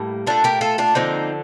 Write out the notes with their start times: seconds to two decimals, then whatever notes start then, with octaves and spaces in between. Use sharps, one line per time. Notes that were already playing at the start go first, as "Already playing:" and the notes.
Already playing: A2 G3 A#3
0.27 A#2 A3 D4 F4
0.44 G4 A#4
0.61 F4 A4
0.78 D4 F4
0.95 D3 F3 A#3 C4 D#4